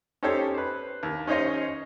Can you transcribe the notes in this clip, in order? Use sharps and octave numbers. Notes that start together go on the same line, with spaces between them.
C#4 D#4 G4 A4 C5 C#5
B4 C5
D#2
C#4 D#4 C5 C#5 D#5